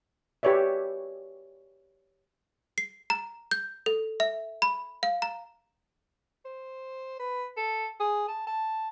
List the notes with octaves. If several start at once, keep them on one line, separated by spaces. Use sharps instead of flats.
G4 B4 C#5 D5 E5
C7
A#5
G6
A4
E5
B5
F5
A#5
C5
B4
A4
G#4
A5
A5